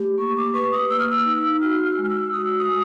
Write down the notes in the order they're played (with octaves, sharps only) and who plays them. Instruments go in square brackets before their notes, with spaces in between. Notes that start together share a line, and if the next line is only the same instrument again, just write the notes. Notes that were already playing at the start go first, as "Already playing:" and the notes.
Already playing: [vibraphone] A3 G4
[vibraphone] A#3 [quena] C#6
[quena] D6
[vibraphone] B4 [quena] C#6
[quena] D#6
[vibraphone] A#3 [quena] E6
[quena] F6
E6
[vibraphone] D#4
[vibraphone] F#4 [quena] F6
[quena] F6
[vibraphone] G#3
[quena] F6
E6
[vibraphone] F#4 [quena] D#6
[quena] E6
D#6
[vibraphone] G#3